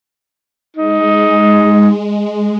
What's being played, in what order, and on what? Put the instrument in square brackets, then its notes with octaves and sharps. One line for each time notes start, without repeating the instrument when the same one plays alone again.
[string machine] G#3 [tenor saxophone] D#4